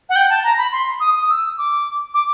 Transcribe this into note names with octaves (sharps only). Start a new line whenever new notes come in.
F#5
G5
A5
A#5
B5
C6
D#6
D#6
E6
D6
D6